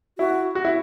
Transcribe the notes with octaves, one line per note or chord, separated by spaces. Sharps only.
E4 F#4
F#4
E4